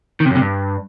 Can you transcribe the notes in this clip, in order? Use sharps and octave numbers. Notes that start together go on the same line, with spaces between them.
D#3
C3
F#2
C3
G2